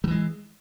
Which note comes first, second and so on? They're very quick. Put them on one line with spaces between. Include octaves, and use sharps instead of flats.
F#3 E3 G#3